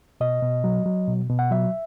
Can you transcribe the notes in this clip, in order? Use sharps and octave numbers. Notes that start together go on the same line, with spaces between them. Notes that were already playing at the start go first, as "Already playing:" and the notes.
B2 D#5
B2
F#3
F#3
B2
B2
F#5
F#3 E5